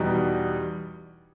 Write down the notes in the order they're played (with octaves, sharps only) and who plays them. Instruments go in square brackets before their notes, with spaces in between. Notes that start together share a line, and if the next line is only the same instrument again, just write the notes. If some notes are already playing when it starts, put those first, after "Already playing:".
Already playing: [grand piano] E2 B2 G3 D#4